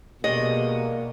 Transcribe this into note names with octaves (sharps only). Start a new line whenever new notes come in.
B2 D#3 G3 G#3 A#3 D#5